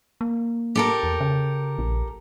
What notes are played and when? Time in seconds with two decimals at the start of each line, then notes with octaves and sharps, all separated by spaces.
0.21 A#3
0.75 G4 A4 A#4
1.03 E2
1.20 C#3
1.78 A#1